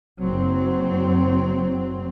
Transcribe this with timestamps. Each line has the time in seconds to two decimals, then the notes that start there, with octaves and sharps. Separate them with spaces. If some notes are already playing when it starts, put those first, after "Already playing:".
0.19 F#1 F#3 C4